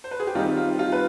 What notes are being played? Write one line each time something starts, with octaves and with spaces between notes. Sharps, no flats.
C5
B4
G#4
G4
D#3 G3 C4 D#4 F4
F4
F4
B4